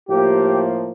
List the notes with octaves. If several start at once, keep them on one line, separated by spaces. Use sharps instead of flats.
A2 F3 A#3 G4